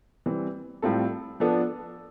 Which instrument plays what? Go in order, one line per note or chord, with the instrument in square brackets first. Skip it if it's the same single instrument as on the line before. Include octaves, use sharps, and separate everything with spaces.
[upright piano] E3 G3 C4
A2 G3 C4 F4 A4
F3 B3 D4 A4